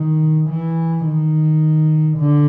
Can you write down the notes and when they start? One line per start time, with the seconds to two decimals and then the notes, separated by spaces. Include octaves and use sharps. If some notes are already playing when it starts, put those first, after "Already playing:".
Already playing: D#3
0.49 E3
1.05 D#3
2.18 D3